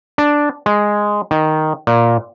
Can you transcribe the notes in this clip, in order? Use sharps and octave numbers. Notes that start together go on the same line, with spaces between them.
D4
G#3
D#3
A#2